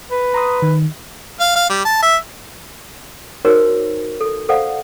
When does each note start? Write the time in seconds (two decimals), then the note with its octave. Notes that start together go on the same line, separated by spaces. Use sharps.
0.11 B4
0.34 A#5 C6 D#6
0.62 D#3
1.40 F5
1.55 F5
1.69 G3
1.85 A5
2.02 E5
3.45 D#4 F#4 A#4 C5 C#5
4.21 A4
4.49 A4 C5 D5 F5 F#5